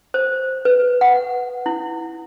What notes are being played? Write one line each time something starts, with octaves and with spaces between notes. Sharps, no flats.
C5
B4
F#5
E4